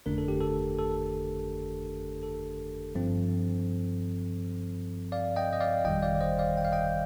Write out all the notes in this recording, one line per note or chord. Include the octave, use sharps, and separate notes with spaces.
G1 F2 D3 A3 D4 A#4
A4
G4
A4
A4
A4
G2 F3 C4
D5 F5
D#5 G5
D#5
D5 F5
G1 F2 D#3 G3 D#5 G5
D5 F5
D5
C5 D#5
D5 F5
G5
F5
D#5 G5